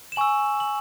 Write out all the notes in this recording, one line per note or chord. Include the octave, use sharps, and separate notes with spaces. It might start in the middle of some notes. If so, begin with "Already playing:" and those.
E7
G#5 C#6 E6 F#7
F#7